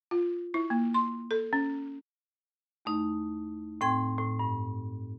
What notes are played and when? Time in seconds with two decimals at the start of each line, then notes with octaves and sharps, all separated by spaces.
0.11 F4
0.54 E4
0.70 A#3
0.94 C6
1.31 A4
1.53 C#4
2.85 E2 A3 D#4
3.81 A2 C4 G5 C6 G#6
4.18 A2
4.39 G2